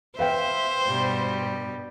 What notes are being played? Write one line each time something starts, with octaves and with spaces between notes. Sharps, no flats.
B4 C5 E5 F5 G5
G2 B2 G3